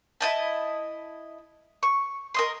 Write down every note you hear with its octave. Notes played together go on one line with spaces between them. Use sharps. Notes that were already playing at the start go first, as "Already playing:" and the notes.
E4 D#5 A5
C#6
A#4 D#5 C6